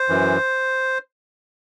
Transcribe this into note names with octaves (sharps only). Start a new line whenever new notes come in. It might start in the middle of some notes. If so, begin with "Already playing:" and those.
Already playing: C5
F#2 E3